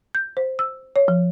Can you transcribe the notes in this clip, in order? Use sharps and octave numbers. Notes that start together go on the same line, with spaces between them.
G6
C5
E6
C#5
F3